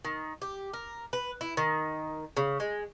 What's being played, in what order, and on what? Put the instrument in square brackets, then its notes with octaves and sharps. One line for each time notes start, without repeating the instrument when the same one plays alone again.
[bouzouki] D#3
G4
A#4
B4
E4
D#3
C#3
G#3